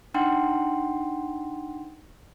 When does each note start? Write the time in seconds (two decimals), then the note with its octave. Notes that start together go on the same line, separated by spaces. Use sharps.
0.14 D4 D#4 F#5 G5 C6